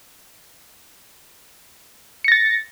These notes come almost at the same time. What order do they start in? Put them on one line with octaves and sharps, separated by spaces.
C#7 A#6 A6